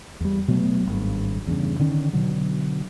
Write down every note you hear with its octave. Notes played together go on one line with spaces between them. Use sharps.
E2 G3
B2 F#3 A3 B3
G#1 G2
E2 G2 C#3
D3 D#3 C#4
B2 D3 F#3